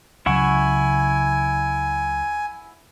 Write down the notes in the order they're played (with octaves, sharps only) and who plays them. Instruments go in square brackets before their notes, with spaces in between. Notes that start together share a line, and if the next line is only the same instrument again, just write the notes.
[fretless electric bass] C#2 C#3 F#3 [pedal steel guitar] E4 F#5 C#6 [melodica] G#5